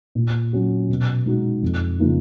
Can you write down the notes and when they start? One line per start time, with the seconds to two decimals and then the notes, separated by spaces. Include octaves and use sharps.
0.15 A#2
0.53 F#3 C#4 F#4
0.89 B2
1.26 G#3 D#4 F#4
1.62 F2
1.99 C#3 F3 A#3 D#4